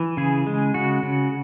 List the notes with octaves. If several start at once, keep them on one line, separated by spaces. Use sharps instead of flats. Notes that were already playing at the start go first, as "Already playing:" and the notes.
Already playing: E3
C#3 G#4
G#3
C#3 F#4
C#3